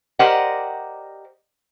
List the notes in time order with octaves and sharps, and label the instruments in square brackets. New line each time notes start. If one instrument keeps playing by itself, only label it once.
[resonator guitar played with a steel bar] G4 A#4 C5 D5 D#5 F#5